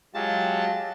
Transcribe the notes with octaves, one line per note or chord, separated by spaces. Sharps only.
F#3 G#3 F4 G4 A5